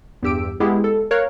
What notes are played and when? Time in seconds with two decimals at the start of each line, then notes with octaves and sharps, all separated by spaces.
0.23 E2 G2 G4 E6 D7
0.60 G#3 B3 E4 G4 G#4
0.84 A4
1.11 A#4 C#5 F5 F#6